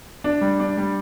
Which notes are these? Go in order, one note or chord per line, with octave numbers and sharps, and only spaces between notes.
D4
G3
D4
G3